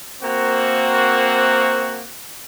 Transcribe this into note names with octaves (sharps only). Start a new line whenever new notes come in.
A#3 C4 F#4